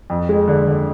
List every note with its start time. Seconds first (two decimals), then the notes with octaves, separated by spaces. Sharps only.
0.10 F2
0.29 G#3
0.48 D3
0.67 D3